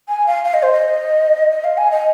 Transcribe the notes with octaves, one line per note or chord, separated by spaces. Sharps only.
G#5
F5
F5
D#5
C5
D#5
D#5
F5
G#5
D#5